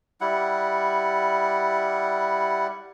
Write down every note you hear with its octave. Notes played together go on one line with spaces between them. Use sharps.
G3 E4 F#5